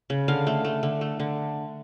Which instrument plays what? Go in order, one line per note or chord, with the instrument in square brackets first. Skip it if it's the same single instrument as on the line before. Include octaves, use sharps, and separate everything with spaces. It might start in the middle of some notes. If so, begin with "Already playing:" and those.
[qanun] C#3
D3 F5
A3
A3
D3
A3
D3